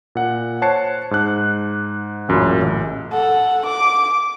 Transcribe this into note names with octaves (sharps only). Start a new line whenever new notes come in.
A#2 F#5
C5 C#5 A5 F#6 C7 C#7
G#2 F#6
A1 F#2 A#2 C#3 B5
A1
A4 F#5
D6